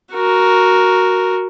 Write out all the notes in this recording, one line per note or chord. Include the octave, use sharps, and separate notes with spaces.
F#4 A#4